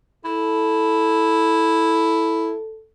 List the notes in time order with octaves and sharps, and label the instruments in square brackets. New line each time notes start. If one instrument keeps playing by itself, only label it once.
[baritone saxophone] E4 [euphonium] A4